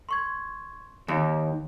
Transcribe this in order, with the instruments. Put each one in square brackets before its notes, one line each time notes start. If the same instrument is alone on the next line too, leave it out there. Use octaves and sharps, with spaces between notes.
[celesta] C6 C#6 G#6
[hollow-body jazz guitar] D#2 [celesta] D#4